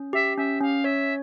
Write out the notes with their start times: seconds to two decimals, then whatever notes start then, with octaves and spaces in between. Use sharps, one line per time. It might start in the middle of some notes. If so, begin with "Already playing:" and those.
Already playing: C#4
0.13 G4 E5
0.37 C#4 E5
0.61 C#4 F5
0.84 C#5 E5